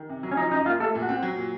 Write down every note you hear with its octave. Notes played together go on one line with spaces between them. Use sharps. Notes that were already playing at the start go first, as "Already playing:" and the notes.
Already playing: D#3
C3
F#3
C#4
F3 D#4
F#2 D#4
A#3 F4
A3 A4
A#2
F#4
C4
F#3
A#2